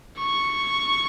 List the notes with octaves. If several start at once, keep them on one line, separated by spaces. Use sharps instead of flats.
C#6